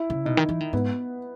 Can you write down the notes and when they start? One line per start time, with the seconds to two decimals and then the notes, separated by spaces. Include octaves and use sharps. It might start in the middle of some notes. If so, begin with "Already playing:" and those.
Already playing: E4
0.10 C#3
0.25 B2 D#4
0.37 D#3
0.49 E3
0.60 D#3
0.73 G#2 B3